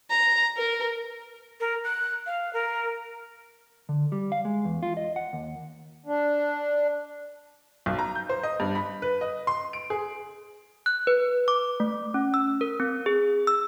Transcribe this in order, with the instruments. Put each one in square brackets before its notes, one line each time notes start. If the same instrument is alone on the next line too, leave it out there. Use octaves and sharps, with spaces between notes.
[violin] A#5
A#4
[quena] A#4
F#6
F5
A#4
[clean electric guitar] D3
G3
F5
G#3
E2
F4
D#5
F#5
D#2
[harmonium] D4
[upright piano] B1
A#5
G6
C5
D#5
G2
B5
B4
D#5
C6
D7
G#4
[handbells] F#6
B4
D6
A3
C#4
E6
A#4
C4
G#4
E6